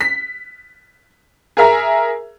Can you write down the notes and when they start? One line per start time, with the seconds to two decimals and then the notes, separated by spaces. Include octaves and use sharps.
0.01 B6
1.57 G#4 A#4 E5 A#5